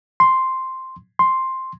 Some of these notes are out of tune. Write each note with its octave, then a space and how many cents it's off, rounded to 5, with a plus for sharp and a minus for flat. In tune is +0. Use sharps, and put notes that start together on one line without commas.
C6 +0
C6 +5